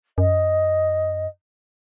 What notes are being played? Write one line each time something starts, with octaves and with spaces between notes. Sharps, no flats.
F#2 D#5